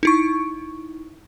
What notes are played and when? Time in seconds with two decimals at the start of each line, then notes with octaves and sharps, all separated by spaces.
0.03 D#4 E4 C#6